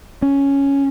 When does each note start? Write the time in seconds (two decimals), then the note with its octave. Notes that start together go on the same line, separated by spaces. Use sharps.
0.22 C#4